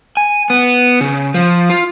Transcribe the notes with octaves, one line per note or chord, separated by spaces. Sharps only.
G#5
B3
C#3
F3
F4